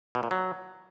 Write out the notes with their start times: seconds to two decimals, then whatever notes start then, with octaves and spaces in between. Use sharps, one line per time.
0.15 B2
0.23 A#2
0.31 F#3